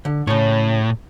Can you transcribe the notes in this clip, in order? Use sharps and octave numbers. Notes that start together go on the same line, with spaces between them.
D3
A2 C#3 C#5